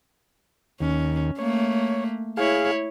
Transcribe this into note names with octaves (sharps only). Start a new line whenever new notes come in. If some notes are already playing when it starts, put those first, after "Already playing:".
D#2 C#4
A3 A#3 C#5
E4 G#4 C#5 F5